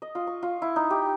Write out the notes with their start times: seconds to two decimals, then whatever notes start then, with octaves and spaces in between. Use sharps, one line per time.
0.02 D#5
0.15 F4
0.27 C#6
0.43 F4
0.62 E4
0.76 D#4
0.90 G4